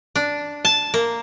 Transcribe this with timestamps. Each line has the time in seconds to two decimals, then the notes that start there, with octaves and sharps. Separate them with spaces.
0.16 D4
0.65 A5
0.94 A#3